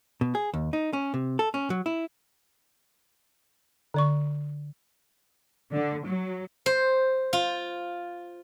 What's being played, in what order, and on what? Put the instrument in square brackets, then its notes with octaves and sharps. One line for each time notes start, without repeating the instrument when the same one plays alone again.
[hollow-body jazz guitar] B2
G#4
D#2
D#4
C#4
C3
A4
C#4
F#3
E4
[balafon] D3 D5 C#6
[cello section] D3
F#3
[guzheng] C5
F4